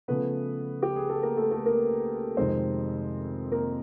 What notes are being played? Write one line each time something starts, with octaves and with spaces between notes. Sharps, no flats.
C#3 F3 A3 B3 B4
G4
G#4
A4
A#3 A#4
A3 A4
A3 A4
A#3 A#4
F2 C3 D#3 G#3 C4 C5
A#3 A#4